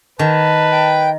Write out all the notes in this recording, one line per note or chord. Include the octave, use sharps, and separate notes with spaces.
D#3 B4 A5
G5